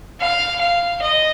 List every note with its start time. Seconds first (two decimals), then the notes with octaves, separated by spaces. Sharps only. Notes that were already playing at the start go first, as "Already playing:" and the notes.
0.21 F5
0.61 F5
1.01 D#5